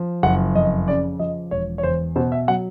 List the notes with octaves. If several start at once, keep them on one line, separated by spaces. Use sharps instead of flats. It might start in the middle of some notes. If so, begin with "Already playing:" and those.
Already playing: F3
F#1 F#5
F2 D#5
C#3 D5
F3 D#5
E1 C#5
C#5
E2 C5
B2 C5
E5
F#3 F#5